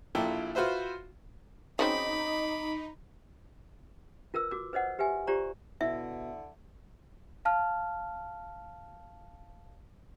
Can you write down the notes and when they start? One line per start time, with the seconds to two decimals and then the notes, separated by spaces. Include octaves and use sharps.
0.15 A#1 A#2 E4 A4 G5
0.55 F4 F#4 B4 C5 E5
1.79 C#3 F#3 C4 D#4 D#5 B5 D6
4.34 F4 A#4 B4 E6
4.51 F#4 D6
4.73 B4 C5 D#5 F#5
4.99 G4 B4 E5 G#5
5.27 F4 G4 C5 D5 A#5 C#6
5.81 B2 D3 E4 E5
7.45 F5 A5 F6